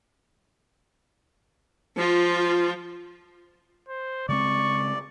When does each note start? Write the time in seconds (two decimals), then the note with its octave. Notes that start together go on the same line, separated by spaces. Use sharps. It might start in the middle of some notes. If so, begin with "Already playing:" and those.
1.97 F3 F4
3.89 C5
4.29 C#3 G#3 C4 D5 C#6